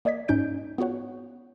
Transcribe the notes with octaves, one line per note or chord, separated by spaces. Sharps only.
A#3 D5 D#5 G#6 B6
G#2 C#4 D#4 G6 D7
B3 F4 F#4 C#5 F#5